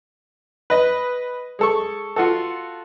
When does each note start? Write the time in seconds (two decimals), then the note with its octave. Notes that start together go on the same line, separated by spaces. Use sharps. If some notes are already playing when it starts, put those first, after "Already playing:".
0.70 B4 D#5
1.59 G#3 A4 C#6
2.16 F4 F#4 A4